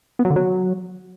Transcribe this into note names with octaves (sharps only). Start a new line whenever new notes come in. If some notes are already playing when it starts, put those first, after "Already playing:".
B3
F#3
D3
F#3